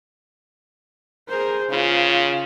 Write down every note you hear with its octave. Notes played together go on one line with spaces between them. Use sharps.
G#4 A#4 C5
C#3 F4